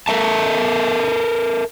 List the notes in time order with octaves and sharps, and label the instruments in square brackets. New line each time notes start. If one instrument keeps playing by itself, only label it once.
[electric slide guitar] A4 A#4 E5 A5